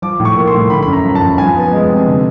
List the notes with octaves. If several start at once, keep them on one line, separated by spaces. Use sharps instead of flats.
F3 D6
A2
C#6
A#3
C6
A2
D3 B5
F#2 B5
A#5
F3
A5
F#2
F3 G#5
B3
G#3
C3
D3